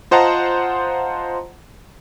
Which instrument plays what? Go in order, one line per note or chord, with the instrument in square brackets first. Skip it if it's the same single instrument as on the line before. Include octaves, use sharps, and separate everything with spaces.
[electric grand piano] F4 C5 D#5 F#5 A5 A#5